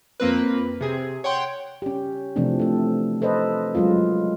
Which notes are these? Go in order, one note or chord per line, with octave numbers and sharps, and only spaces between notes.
F2 A#3 C4 B4
C3 G#4
C#5 F#5 G5 C6
C#4 G4
C3 E3 F3 A3 C4 D4
A3 A4
A4 B4 C5 D#5
F#3 G#3 C#4 F4